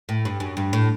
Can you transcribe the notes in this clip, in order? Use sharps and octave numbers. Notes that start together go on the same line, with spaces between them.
A2
G2
F#2
G2
A2